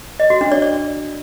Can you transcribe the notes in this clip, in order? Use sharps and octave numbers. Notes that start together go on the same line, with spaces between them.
D#5
F#4
D4
D5
D5